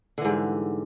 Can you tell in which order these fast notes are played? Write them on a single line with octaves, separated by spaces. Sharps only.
D3 E3 G#2 G3